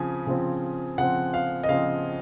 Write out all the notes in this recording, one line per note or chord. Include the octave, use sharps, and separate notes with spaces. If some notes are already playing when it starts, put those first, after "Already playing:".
Already playing: C#3 F3 C4 G#5
C#3 F3 C4
C#3 F3 C4 F#5
F5
D#5
C#3 F3 C4 F5